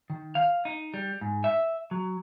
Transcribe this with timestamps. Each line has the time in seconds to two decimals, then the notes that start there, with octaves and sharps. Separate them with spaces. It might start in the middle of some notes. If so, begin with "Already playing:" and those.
0.10 D#3
0.35 F5
0.65 D#4
0.94 G3
1.21 G#2
1.44 E5
1.91 F#3